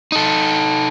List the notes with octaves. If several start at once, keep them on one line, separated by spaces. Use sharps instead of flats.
D#4 A4